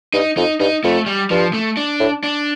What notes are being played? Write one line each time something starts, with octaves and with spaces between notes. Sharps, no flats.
G2 D#4
F2 D#4
G2 D#4
F2 A3
G3
G2 F3
A3
D4
A2
D4